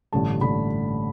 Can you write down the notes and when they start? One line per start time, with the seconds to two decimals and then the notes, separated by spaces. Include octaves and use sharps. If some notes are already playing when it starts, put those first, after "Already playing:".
0.13 A1 G2 D3 A3 A5
0.41 D3 A3 B5